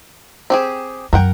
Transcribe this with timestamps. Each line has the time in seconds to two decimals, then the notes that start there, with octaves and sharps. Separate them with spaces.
0.50 C4 G4 G#4
1.13 F#2 A#4 F#5 G5